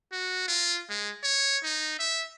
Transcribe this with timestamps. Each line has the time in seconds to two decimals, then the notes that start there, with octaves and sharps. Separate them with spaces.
0.12 F#4
0.48 F4
0.90 G#3
1.23 C#5
1.64 D#4
1.99 E5